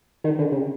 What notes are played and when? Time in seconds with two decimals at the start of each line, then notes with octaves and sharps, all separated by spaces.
0.24 D#3
0.39 D3
0.52 C#3